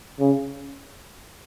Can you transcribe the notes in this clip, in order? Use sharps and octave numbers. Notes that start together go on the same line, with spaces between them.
C#3